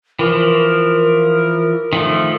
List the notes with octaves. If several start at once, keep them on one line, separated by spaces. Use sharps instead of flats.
E3 F3 A#4
D#3 F3 A3